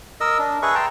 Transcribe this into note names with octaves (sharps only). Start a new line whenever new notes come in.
A#4 D#5 E6
D4
G#4 B4 E5 C#6
G5 A5 A#5 C6